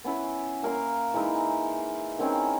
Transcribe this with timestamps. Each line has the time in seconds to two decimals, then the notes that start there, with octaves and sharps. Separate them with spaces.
0.04 B3 C#4 E4 B4
0.63 A#3 A#4 F5 C6
1.14 E3 G#3 D#4 E4
2.19 D#3 C4 C#4 E4